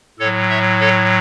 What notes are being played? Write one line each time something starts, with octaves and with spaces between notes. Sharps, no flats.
A2 F#3 A4 C#5
C#5 E5
A4 C#5